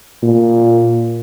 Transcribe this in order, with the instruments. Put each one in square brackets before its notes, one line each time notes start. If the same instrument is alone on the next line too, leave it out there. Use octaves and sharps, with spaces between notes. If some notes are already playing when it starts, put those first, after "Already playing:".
[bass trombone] A#2